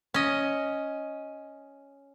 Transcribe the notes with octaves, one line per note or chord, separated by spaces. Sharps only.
C#4 D#5